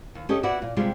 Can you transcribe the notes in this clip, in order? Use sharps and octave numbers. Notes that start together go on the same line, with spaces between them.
D#2
C#4 G4 A4 C#5 D#5
B3 E4 F#4 D5 E5 F#5
A#2
C3 G3 G#3 F4